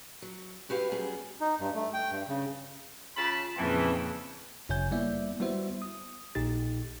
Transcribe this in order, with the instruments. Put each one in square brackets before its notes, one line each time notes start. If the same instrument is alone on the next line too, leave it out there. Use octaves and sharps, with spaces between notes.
[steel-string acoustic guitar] F#3
G2 F#4 G4 B4 F5
F#3 G3 B3 C#4 G#4
[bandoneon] D#4
G2
A3
G5
G2
C#3
[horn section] C#3 A5 B5 [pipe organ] F4
[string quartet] F2 A#2 C#3 [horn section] E3 [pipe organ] A#3 C4 A5
[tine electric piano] G1 F#2 C#3 C#5 G#5 G6
G3 A#3 B3 E4 D5 E5
G3 B3 E4 F#4 C5 E5
D#6
A#1 A#2 D#4 G4 A6